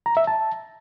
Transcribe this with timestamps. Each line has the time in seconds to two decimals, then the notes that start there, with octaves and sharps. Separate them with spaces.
0.06 A#5
0.17 E5
0.27 A5